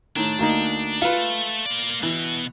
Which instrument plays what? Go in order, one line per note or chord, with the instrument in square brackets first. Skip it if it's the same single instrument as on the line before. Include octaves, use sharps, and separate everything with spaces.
[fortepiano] A2 D#3 [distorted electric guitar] D4
[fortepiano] D2 A#3 D#4
[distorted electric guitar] A3 [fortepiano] F4 B4
[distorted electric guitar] A#3 D5
[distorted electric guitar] B2 B3 [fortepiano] E3